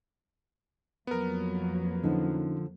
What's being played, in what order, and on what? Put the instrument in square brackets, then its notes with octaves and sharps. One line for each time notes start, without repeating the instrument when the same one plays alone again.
[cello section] F2 F#3 A#3 [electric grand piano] B3 A#4
[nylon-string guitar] D3 F3 [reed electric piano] C#4 D#4